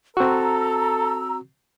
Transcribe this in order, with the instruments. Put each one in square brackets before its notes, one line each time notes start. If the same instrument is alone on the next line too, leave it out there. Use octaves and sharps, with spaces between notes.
[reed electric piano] C4 F#4 [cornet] A4 [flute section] A#5 E6